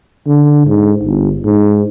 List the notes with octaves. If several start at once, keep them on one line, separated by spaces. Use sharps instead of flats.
D3
G#2
G1
G#2